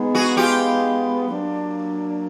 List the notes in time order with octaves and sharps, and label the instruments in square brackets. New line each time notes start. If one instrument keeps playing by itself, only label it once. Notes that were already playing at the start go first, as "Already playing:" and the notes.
Already playing: [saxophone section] G#3 B3 D#4
[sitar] F#4 G#4
F4 G4
[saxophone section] F#3 A#3 D4